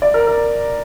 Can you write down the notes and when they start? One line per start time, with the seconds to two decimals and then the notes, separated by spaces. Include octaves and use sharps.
0.02 D5
0.14 A#4
0.27 A#4